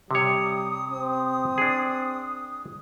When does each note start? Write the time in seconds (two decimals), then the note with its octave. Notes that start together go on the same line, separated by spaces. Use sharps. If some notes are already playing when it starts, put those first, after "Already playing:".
0.11 C3 G3 C#5 D#6
0.92 C4
1.58 D4 G#4